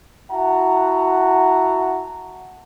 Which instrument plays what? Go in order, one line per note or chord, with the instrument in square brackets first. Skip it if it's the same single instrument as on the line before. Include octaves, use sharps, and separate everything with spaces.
[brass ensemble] E4 F#4 E5 F#5 A5 A#5